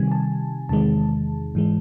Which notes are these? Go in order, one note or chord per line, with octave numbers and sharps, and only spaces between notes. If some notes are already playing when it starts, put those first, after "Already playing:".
Already playing: C3 D#3 G3 G#5
A5
E2 C3 D#3 G#3 A5
G#2 E3 G#3